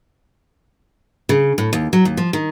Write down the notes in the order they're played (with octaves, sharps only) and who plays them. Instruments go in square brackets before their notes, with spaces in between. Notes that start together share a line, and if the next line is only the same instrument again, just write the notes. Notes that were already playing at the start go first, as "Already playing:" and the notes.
[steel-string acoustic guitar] C#3
A2
D#2
F#3
D#2
F3
D#3